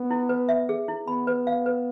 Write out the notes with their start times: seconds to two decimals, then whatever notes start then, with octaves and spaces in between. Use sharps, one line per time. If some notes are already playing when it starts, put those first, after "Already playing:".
Already playing: B3
0.11 E4
0.29 B4
0.49 E5
0.69 G#4
0.88 E4
1.07 B3 B5
1.27 B4
1.47 F5
1.66 B4